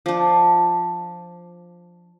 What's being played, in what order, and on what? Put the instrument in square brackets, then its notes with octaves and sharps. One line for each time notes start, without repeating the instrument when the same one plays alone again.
[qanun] F3 D4